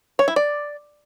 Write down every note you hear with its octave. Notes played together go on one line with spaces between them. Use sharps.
C#5
E4
D5